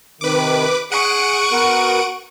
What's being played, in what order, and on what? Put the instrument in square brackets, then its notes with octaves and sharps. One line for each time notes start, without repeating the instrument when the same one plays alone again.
[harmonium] C3 D#3 [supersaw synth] B4 D6
[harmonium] G#4 [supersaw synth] F#5 D7 D#7 [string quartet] C#6
[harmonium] B3 F#4 A#4